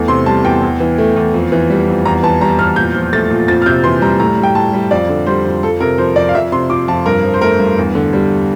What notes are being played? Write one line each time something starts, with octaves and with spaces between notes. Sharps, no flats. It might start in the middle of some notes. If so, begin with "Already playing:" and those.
Already playing: E2 A3
C3 C6
G3 A5
E2 G5
E2
E3
A3
E2
F2
E3
G3
F2
E2 A#5
E3 A5
G3 A#5
E2 F6
A#2 G6
F3
A3 A6
A#2
F2 A6
F6
C3 G6
E3 C6
G3 A#5
A2 A#5
G3
G5
A2 A5
G3
F2 D5
D3
G3 C5
F2
F2 A4
C3 A#4
F3 C5
F2 D5
F5
F2 E5
C3 C6
F3 D6
F2 A5
G2 A#4
F3
C5
A3 A#4
G2
E2
D3
G3